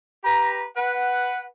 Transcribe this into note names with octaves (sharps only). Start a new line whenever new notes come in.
G4 B4 A#5
B4 F#5